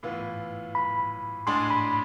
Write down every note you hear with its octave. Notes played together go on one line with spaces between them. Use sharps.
A2 E3 B3 F4
B5
A2 G#3 D4 G#4 C6
B5